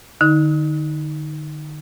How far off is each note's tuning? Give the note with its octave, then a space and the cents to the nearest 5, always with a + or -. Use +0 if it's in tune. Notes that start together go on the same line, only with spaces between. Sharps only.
D3 +40 D#4 +20